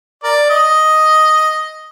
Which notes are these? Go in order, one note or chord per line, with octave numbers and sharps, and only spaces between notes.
A#4 D5
D#5